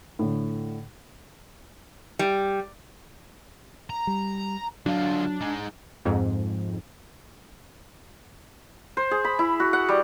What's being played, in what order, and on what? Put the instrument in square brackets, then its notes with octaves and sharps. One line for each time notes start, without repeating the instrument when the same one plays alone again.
[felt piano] A2 D3
[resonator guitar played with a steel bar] G3
[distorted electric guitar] A#5
[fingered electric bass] G3
[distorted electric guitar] D3 F4 [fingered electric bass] F#3 [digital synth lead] D4
[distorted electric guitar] D#4 G#4
[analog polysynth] F2 G#2
[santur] C5
G#4
B5
E4
F#4
F#5
G3